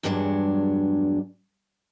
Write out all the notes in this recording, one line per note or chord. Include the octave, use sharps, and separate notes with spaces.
E2 G2 D3 F#3 G#3 D4